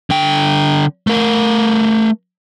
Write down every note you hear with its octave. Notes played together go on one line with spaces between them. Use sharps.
D3 G5
A3 A#4